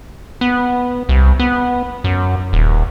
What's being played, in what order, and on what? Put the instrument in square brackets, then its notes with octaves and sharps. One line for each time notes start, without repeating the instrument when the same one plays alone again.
[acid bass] B3
C2
B3
F#2
D#1